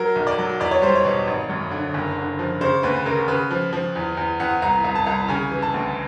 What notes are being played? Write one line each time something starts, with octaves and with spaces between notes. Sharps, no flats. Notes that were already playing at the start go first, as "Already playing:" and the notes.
Already playing: F#3 A#4
B1
D5
F#3
E2 D5
C#5
G3 C5
C#5
B2
G#1
F#2
D3
F#1
D3
F3
C#3 C5
D2 B4
C#3 A#4
C#3 B4
F3
F3
E2
E2
E2 F#5
C2 A#5
C2
A5
C2
C#3 G#5
E3
A5
D2